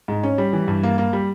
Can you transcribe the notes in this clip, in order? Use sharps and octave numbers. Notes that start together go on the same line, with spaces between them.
G#2
C#4
G3
E3
G2
A#3
A#3
G3